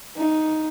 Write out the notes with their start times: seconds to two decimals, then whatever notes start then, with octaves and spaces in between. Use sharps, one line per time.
0.16 D#4